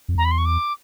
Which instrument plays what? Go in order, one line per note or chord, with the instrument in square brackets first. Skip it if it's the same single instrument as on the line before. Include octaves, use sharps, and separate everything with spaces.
[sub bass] F2
[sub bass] E2 [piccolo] A#5
[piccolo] B5
C6
C#6
D6